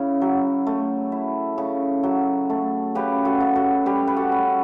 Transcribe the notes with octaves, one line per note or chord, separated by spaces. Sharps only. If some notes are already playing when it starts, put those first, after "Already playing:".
Already playing: C#3 E4
F#3
A3
E4
C#3
F#3
A3
C#3 G4 B4
F#4 A4
C#3
F#4 A4
G3 G4 B4
B4
F#4 A4
C#4